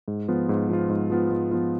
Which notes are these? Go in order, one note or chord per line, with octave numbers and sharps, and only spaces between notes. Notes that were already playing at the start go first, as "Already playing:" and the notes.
G#2
F3 B3 F4
G#2
F3 B3 F4
G#2
F3 B3 F4
G#2
F3 B3 F4